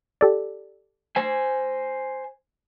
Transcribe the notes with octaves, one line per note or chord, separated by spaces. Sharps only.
G4 A4 D5
C5 G#5